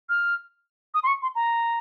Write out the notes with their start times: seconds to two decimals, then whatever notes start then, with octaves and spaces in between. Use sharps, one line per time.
0.09 F6
0.94 D#6
1.03 C6
1.07 C#6
1.22 C6
1.35 A#5